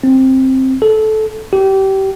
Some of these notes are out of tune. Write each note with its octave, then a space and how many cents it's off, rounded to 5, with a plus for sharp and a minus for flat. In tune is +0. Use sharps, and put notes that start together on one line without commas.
C4 +10
A4 -15
G4 -25